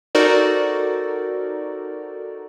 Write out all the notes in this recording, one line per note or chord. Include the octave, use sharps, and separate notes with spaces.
D#4 F#4 A4 A#4 C5 D5